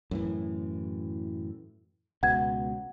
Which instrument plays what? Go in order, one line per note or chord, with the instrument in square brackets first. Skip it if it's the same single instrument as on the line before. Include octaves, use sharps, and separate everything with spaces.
[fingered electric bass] F#2 A2 E3
[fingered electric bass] C#2 B2 [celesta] F#5 G#6